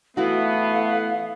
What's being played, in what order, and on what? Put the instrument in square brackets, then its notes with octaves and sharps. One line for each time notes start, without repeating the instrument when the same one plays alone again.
[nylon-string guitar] E3 E4 F#4 [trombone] A3 [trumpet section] B3 [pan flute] F5